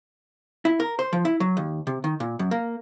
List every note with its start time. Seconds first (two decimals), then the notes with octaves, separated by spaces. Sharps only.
0.65 E4
0.80 A#4
0.99 C5
1.13 F3
1.25 E4
1.40 F#3
1.57 D#2
1.87 C3
2.04 D#3
2.20 A#2
2.39 F#2
2.51 A#3